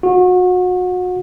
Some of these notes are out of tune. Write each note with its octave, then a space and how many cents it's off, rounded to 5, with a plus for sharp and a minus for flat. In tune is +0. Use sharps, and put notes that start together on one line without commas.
F#4 -30